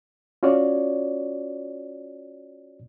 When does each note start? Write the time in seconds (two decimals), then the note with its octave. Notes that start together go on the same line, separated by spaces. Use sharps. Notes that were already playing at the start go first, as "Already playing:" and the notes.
0.43 C#4 F4 F#4 C#5 D5